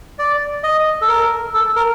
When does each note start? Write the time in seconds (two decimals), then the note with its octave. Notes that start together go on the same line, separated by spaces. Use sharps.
0.19 D5
0.63 D#5
1.02 A4
1.09 A#4
1.54 A4
1.76 A#4